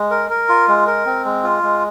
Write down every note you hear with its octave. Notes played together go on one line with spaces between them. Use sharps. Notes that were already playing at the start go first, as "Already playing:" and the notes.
Already playing: G#3
A#4
A#4
F4
G#3
A#4
C4
G#3
F4
G#3